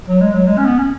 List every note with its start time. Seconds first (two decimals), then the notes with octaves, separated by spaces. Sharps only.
0.08 F#3
0.21 G#3
0.33 F#3
0.46 G#3
0.58 C#4
0.66 B3
0.79 C#4